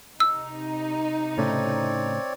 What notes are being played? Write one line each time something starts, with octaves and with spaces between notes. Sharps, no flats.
C3 D#4 E6
A2 C#3 A3 C4 C#5 D5